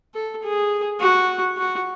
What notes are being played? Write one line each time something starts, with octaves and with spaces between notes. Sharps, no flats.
A4
G#4
F#4
F#4